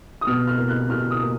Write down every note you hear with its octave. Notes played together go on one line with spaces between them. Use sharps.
D#6
B2 F6
F6
A#3
F#6
B2 F6
D#6
A#3